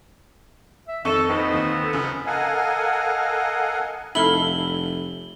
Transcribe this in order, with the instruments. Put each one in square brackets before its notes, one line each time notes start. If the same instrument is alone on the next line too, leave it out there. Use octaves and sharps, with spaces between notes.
[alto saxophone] E5
[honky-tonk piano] F2 C#6 D#7 [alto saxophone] D#3 [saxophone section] A4
[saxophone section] A#2 B3 C4 [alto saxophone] D#4
[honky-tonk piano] D#2
[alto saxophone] A4
[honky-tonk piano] F#1 F#2 D#6
[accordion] A4 A#4 D#5 F5 F#5 G#5
[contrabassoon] F1 [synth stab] D#4 A4 F5 [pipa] E4 [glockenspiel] F#7 G7